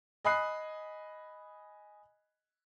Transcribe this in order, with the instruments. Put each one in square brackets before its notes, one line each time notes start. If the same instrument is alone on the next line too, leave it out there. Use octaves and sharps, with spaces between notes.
[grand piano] D#5 G#5 B5 D#6 F#6 C7